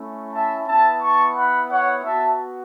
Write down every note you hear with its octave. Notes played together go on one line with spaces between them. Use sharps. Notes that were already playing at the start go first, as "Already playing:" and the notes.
Already playing: A3 C#4 E4
E5 A5
B3 E4 E5 A5
A5 C#6
F#5 B5
C#5 F#5
B3 F#4 E5 A5